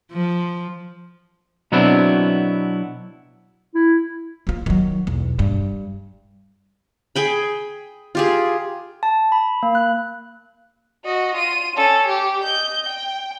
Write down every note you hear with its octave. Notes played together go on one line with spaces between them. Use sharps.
F3
B2 F#3 B3 C4 D4 E4
E4
F3 F4
D#3 F#3
B1 E2
G2
G#4 G5 B5
F4 G4 G#4
A5
B5
A#3
F#6
F#4 D#5
F4 D#7
C#4 A4
G4
D#5 G6
G5